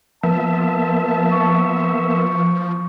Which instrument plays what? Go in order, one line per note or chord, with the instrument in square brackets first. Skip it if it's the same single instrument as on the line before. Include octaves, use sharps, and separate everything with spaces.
[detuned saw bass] F3 [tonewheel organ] A#3 B3 E5 [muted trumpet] A5
[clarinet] C#6